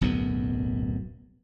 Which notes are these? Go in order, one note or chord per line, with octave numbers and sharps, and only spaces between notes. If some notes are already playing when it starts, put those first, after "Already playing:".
D1 B1 F#2 B3